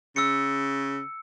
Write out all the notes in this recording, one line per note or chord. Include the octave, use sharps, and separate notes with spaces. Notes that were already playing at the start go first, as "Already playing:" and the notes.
C#3 E6 C#7